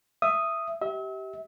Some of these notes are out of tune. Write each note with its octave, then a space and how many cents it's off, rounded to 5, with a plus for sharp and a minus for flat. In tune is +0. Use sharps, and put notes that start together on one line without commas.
E5 +15 D#6 +0
G4 -20 E5 -40